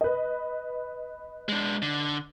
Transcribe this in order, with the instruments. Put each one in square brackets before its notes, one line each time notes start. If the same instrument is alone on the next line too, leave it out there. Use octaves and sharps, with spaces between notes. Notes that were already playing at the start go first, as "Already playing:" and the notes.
[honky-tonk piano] B4 D#5
[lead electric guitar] G#3 D4
D3